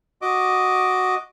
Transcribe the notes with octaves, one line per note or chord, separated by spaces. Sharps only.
F#4 D#5 D6